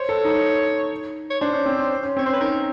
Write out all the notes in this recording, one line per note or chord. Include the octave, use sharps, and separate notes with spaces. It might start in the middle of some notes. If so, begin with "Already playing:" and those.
Already playing: C5 C#5
A4
D#4
C#5
D4 C5
C#4
C4
C#4
C#4
C4 C#5
C#4 C5
B4
D#4 A#4